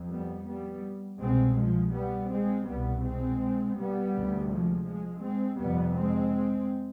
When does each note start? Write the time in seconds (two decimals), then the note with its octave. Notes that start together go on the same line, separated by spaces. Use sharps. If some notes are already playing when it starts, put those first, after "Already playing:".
Already playing: F2
0.11 G3 B3
0.47 G3 B3
1.20 C2 B2 G#3 C4
1.57 F3 G#3
1.94 G3 B3
2.30 G#3 C4
2.67 C2 B2 G3 B3
3.03 G#3 C4
3.77 G3 B3
4.13 D2 C3
4.49 F3 G#3
4.86 F3 G#3
5.23 G#3 C4
5.59 F2 C3 G3 B3
5.96 G#3 C4